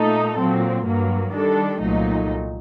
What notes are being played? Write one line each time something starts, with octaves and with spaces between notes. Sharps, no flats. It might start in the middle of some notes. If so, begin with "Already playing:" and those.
Already playing: A#2 A3 D#4 A4
A#2 F#3 C4
G2 F#3 A#3
D#3 G3 D4 A4
C2 A#2 F#3 A3 D#4